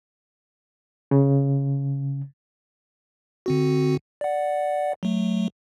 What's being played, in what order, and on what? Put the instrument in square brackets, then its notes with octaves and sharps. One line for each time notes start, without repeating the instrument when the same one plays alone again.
[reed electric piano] C#3
[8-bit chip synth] D3 C4 F#4
D5 F#5
F#3 A3